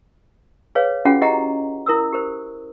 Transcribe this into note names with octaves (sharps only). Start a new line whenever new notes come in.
G#4 B4 C#5 F5
C#4 F4 F#4 G#4 F#5
E4 G4 G#4 D#5 F#5 A#5
E4 A#4 D#6 E6
G4 A#4 C5